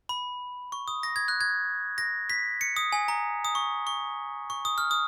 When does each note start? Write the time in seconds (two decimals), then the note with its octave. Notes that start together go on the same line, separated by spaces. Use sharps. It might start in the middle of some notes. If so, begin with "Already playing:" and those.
0.09 B5
0.72 C#6
0.88 D#6
1.03 A#6
1.16 G#6
1.28 F#6
1.41 G#6
1.98 A#6
2.30 B6
2.61 C#7
2.76 D#6
2.92 G#5
3.08 A#5
3.45 D#6
3.55 C#6
3.87 C#6
4.50 C#6
4.65 D#6
4.78 F6
4.91 D#6